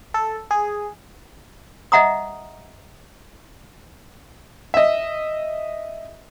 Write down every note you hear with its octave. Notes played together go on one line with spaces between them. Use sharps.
A4
G#4
D#5 E5 F#5 A#5 D#6
D#5 E5